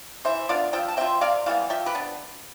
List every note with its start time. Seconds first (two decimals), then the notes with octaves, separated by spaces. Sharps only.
0.25 E3 C5 E5
0.49 B3 D4 F4 D5 F5
0.73 F3 E5 G5
0.88 A5
0.97 C4 F4 E5 G5
1.21 C3 D5 F5
1.46 E3 G3 B3 F5
1.70 F3 E5 G5
1.86 G4 B4
1.95 B3 D4